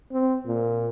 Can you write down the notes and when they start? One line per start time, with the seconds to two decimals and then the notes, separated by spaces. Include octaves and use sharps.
0.12 C4
0.46 A#2